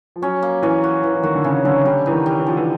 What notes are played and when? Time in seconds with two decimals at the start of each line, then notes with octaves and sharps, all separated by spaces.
0.16 F3
0.22 F#3 C#4
0.42 A#3
0.62 E3 C#4
0.84 F#4
1.03 E3 A#3
1.15 E3
1.23 D#3 F#4
1.35 D3
1.44 C#3 C#4
1.65 D3 F#3
1.85 D3 G3
2.06 E3 D#4
2.12 D#3
2.26 G3
2.39 E3
2.47 D3 F3
2.57 E3